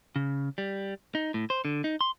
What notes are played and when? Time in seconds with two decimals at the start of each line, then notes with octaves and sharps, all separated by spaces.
0.16 C#3
0.58 G3
1.15 D#4
1.34 A2
1.50 C5
1.65 D3
1.84 D#4
2.01 C6